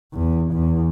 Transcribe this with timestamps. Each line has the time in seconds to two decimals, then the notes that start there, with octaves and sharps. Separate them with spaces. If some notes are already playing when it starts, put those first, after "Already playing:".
0.14 E2
0.53 E2